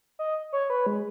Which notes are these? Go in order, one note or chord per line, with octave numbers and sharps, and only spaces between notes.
D#5
C#5
B4
G#3